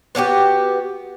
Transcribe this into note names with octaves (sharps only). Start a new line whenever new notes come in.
B3 D4 F#4 G4